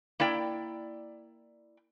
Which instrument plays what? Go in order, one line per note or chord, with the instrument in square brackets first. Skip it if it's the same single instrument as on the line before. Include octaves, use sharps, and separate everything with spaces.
[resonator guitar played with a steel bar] A#3 E4 D5 G5